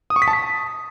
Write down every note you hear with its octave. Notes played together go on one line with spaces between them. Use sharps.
D#6
C#6
B6
A5
B6